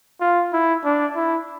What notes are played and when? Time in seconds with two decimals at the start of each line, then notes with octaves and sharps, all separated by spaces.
0.21 F4
0.53 E4
0.85 D4
1.16 E4